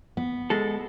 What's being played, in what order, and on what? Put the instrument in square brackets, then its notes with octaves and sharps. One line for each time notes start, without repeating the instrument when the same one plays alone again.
[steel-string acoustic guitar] B3
[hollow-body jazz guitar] G#3 A4